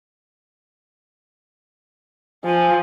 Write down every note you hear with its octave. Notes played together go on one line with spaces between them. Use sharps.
F3 G#5